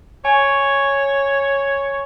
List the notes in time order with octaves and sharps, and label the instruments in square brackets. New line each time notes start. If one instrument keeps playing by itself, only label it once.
[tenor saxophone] C#5 [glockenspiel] G#5